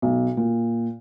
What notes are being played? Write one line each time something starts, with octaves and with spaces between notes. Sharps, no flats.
B1
A#2